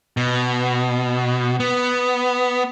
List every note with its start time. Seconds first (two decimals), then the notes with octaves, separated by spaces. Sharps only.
0.17 B2
1.60 B3